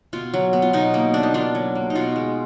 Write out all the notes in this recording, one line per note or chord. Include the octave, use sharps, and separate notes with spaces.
B2 F4
F#3
B3
F4
B2 D#4
A#3
D4
D#4
D4 F4
F#3
A#3
D#4
B2 F4
G#3